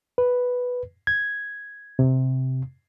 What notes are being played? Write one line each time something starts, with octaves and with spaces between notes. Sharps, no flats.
B4
G#6
C3